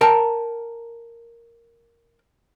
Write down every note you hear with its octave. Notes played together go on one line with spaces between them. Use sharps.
A#4 G5 A5